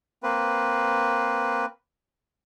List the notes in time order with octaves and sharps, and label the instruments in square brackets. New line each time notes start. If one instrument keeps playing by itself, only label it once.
[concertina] A#3 C4 B4